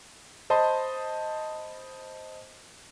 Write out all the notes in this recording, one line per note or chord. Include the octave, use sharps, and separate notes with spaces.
C5 D#5 A5 B5 C6